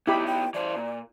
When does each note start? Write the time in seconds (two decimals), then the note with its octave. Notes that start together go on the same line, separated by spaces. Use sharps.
0.07 B3 D#4 E4 G4 B5 D6
0.26 G5
0.54 E3 C5 D5
0.76 A#2